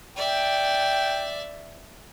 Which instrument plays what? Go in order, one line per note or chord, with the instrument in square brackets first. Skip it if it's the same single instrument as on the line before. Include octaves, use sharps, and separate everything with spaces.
[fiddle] D5 E5 [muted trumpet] G5